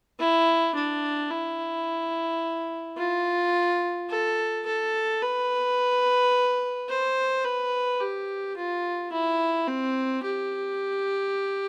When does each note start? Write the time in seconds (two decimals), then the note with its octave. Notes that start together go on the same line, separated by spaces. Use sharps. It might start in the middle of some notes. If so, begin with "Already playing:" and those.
0.19 E4
0.75 D4
1.30 E4
2.98 F4
4.09 A4
4.66 A4
5.21 B4
6.89 C5
7.44 B4
8.00 G4
8.57 F4
9.12 E4
9.67 C4
10.24 G4